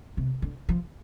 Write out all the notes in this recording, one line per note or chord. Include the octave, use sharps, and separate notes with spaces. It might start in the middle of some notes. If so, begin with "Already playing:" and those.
C3
D3
F3